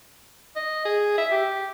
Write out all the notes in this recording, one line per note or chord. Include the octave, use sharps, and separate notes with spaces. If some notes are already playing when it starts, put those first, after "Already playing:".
D#5
G#4
E5
G4